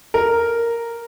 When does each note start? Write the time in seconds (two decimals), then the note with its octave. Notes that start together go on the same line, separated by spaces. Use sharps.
0.14 A#4